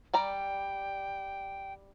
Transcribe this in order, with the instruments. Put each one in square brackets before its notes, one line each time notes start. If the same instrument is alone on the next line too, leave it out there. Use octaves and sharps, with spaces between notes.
[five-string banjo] G3 D5 A#5 [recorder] G5